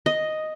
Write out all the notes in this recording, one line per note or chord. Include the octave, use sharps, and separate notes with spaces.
D#5